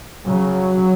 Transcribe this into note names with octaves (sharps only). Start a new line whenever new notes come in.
C#3 F#3